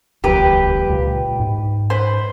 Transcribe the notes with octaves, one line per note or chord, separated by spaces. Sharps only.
D#1 C#2 F#3 G4 B4
C#2 A#2
G#2
B4 C5